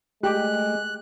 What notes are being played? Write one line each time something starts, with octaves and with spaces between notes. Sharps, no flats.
G#3 A3 G4 F#6